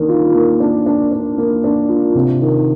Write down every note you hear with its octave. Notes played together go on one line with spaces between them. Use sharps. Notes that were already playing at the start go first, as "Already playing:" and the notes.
Already playing: D#3 A#3 D4
F4
A#3
D4
D4
D4
A#3
D4
F4
C3
D#3